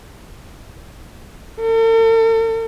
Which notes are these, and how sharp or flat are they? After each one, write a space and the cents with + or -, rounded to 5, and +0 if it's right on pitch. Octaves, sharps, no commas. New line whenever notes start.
A4 +45